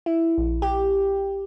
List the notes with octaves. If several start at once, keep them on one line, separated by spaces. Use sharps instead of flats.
E4
A#1
G4